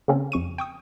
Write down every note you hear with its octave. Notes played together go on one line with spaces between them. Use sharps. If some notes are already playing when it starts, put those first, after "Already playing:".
C#3 A#3 C4 C#4
F2 C#6 D#7
G5 C#6 D#6